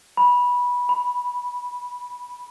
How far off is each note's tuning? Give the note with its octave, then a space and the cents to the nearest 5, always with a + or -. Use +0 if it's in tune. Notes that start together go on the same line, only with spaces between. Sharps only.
B5 -15
B5 +5